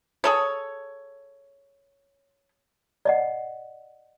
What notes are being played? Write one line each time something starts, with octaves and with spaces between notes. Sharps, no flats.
G#4 A4 C#5
D5 D#5 F#5